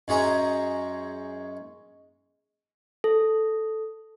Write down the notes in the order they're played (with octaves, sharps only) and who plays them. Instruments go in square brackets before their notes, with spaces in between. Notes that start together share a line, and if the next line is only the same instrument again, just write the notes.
[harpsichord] F#2 G#3 C#4 G#4 A#5
[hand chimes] A4